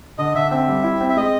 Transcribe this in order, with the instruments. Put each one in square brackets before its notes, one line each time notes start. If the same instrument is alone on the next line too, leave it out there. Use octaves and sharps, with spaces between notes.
[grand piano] D3 [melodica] D#5
[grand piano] D3 [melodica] E5
[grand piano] C4 [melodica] E5
[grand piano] G3
E4
C4
[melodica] E5
[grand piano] G#3 [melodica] D#5